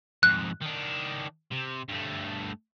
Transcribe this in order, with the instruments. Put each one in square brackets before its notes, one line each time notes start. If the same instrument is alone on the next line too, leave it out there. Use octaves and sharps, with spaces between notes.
[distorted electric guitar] F2 G#2 [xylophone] F#6
[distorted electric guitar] D#3 D4
C3
G2 A3